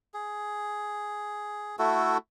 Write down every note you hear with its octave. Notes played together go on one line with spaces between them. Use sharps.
G#4
A3 E4 F#4 A4